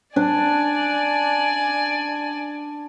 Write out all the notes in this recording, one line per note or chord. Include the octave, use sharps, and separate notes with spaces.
D4 D5 G#5